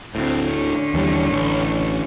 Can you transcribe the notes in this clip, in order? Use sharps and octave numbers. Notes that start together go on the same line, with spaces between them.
D2 A2 C4
D3 C#4
D#2 E3 G3
A1